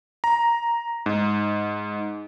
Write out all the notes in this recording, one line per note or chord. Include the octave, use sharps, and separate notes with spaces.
A#5
G#2